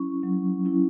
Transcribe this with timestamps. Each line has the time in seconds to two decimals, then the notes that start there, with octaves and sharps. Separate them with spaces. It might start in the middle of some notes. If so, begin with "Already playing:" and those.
Already playing: F#3 C#4 E4 C#6
0.23 F#3
0.65 C#4 E4